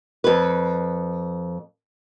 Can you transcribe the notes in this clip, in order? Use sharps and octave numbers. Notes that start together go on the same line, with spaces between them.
F2 B4